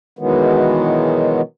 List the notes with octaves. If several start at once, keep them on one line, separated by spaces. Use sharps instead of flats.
B2 D#3 E3 F#3 G#3 B3